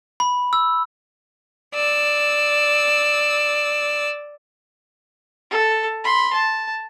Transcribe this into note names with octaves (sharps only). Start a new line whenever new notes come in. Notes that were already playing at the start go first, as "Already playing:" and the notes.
B5
E6
D5 E6
A4
B5 C6
A5